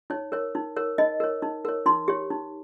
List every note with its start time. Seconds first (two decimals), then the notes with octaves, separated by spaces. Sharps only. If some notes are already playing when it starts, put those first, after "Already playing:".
0.10 D#4 C#5
0.32 A#4 C#5
0.55 D#4
0.76 A#4 C#5
0.98 D#4 D#5
1.20 A#4 C#5
1.42 D#4
1.65 A#4 C#5
1.86 D#4 C6
2.08 G4 C#5
2.30 D#4